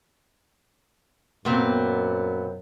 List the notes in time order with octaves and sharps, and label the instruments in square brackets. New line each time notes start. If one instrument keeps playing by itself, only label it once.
[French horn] F#2 [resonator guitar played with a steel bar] A#2 B3 C4